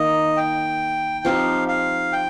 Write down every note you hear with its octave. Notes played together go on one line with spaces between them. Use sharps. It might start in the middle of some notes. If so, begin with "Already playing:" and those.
Already playing: D#3 A#3 D#5
G5
F3 C4 D#4 G4 F5
F5
G5